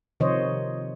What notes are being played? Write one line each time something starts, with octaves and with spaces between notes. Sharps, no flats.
C3 D#3 F3 C5 C#5 D#5